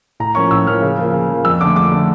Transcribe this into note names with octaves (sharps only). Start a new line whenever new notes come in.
A2 A#5
F3 A#3 C#4 C#6
A2 E6
F3 A#3 C#4 F6
C#3
F3 A#3
C#3
F3 A#3
F2 E6
D3 A3 D6
F2 D6
D3 A3